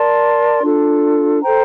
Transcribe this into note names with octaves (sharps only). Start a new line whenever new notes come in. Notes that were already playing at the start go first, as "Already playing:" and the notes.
Already playing: A#4 D5 A5 C6
D4 F4 A4
A4 C5 G5 A#5